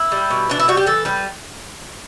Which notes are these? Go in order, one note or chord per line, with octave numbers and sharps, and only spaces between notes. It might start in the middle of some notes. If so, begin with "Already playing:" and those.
Already playing: E4
G3
B2
E3 D4
E4
G3 F#4
G4
E3 A4
G3 B4